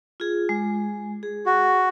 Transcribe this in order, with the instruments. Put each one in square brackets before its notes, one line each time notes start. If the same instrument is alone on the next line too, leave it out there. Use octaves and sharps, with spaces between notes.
[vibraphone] F4 G#4
G#3
G#4
[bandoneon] F#4